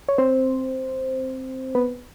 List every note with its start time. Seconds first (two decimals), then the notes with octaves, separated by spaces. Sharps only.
0.09 C#5
0.18 C4 C5
1.75 B3 B4